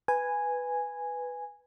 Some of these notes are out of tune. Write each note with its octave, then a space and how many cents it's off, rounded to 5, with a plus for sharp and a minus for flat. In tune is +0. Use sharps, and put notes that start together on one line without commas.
B4 +5 G#5 -5